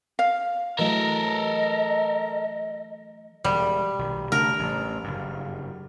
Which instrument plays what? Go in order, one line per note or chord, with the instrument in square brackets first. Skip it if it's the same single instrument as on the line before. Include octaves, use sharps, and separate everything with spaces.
[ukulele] F5
[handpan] E3 F#3 A3 [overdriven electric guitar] A4 A#4 [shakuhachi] D#5
[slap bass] E1 [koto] G3
[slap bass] B1 D#3
[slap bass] C#3 A3 D4 [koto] A#4
[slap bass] A1
F#1 G2